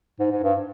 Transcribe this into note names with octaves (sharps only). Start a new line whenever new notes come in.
G#2
G#2
G2